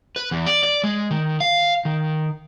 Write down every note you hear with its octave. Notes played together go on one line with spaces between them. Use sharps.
B4
E2
D5
D5
G#3
D#3
F5
D#3